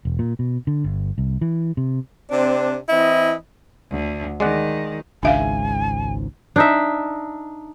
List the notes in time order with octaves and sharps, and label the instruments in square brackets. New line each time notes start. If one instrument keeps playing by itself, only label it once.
[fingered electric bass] E1
A#2
B2
D3
G1
C2
E3
C3
[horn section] C3 C4 D4
E3 C4 E4 D#5
[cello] D2
[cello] D#3 [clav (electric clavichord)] G#3 D5 F#5
[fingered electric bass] G#1 C#2 G#2 [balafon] D4 E5 F5 [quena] G#5
[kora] D4 D#4 E5